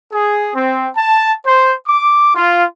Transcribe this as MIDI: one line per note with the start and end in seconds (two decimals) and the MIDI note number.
0.12 0.50 68
0.55 0.88 60
0.96 1.32 81
1.45 1.73 72
1.87 2.33 86
2.35 2.64 65